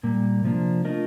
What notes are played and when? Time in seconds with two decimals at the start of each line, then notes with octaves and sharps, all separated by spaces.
0.03 A#2 G3 A#3
0.44 C3 F3 A#3 D4
0.85 A3 D4 F4 A#4 D#5